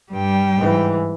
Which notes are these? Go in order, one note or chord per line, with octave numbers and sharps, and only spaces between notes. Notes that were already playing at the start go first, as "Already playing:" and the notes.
G2 G3 G5
G#2 E3